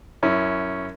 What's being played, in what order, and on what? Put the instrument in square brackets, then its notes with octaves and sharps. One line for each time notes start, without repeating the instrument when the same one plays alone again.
[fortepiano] F#2 C#4 E4